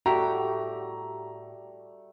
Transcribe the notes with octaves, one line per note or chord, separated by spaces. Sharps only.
A2 G3 A3 F#4 G4 G5 A#5